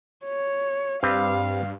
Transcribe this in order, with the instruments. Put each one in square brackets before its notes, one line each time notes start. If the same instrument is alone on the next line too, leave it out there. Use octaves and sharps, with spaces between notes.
[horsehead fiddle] C#5
[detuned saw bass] G2 [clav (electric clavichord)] G3 C4 B4 [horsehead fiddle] F5